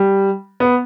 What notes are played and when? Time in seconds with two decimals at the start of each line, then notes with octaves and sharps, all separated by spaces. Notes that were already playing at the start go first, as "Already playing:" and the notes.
Already playing: G3
0.60 B3